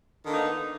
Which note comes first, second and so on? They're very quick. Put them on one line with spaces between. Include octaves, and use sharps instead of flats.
D#3 D3 A#3 D#4 B3